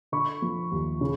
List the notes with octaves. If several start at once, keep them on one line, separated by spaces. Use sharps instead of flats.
D3 B5 C#6
F3
D#2
C#3